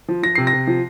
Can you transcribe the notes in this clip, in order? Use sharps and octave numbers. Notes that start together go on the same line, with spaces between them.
F3
F3 A#6
C3 C7
A#6
C3
F3